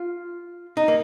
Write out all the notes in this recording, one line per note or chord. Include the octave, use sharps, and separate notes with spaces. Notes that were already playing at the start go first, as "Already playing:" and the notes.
Already playing: F4
D#4
A#3